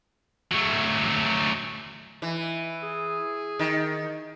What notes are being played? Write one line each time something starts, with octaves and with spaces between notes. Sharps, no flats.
F#3 A3
E3
G#4
D#3